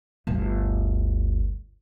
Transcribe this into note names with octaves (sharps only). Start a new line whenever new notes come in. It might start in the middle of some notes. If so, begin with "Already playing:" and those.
G1 D2